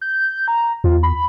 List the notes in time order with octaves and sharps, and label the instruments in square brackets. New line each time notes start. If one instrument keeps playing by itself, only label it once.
[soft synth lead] G6
A#5
[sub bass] E2 [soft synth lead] F4
[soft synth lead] B5